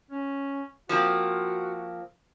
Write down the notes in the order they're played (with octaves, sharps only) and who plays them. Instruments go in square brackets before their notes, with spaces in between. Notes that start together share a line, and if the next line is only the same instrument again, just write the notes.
[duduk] C#4
[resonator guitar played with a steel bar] F3 A#3 C4 [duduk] F#4